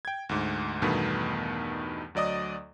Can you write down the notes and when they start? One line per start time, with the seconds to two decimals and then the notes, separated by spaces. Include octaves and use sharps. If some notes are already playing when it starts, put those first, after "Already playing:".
0.05 G5 G#6
0.29 D2 G#2
0.82 E2 G2 B2 D#3 A3 B3
2.15 D2 F#3 D5 D#5 D#6